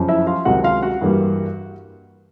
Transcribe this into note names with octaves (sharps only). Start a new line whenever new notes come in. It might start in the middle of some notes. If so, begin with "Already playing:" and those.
Already playing: F#2 C#3 F3
E4 E5
F4 F5
C#2 C3 D#3 F#3 F#4 F#5
F4 F5
F#4 F#5
G2 E3 G3 A#3